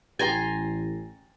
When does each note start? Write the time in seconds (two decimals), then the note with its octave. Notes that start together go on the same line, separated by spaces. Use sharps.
0.19 A1 G5 G#5 A#5 C6 A6